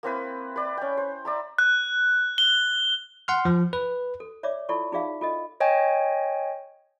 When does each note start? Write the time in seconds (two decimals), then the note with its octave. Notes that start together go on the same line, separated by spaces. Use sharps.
0.03 A#3 C4 E4 B4
0.56 B4 D5
0.77 C#4 G5
0.97 C5
1.25 D5 E5 A#5
1.58 F#6
2.38 G7
3.28 F#5 C6 F6
3.45 F3
3.73 B4
4.20 A4
4.43 C#5 D5 E5 D6
4.69 E4 F4 A4 D5 C#6
4.92 D#4 F4 G#4 D5 E5 F5
5.21 F4 A4 D#5
5.60 C#5 D#5 G5 G#5